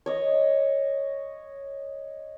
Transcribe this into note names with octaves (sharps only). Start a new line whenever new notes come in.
C#5 D#5